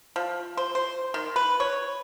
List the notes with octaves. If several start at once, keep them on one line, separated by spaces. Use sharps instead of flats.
F3
C5
C5
D#3
B4
C#5